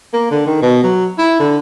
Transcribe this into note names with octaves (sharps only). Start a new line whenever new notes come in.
A#3
D3
D#3
B2
F#3
E4
D3